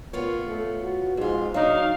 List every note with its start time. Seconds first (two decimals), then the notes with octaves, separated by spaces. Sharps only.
0.13 A#2 B3 F4 C#5
0.47 A3
0.82 F#4
1.17 F2 G#2 F4
1.54 F#3 D4 D#4 F5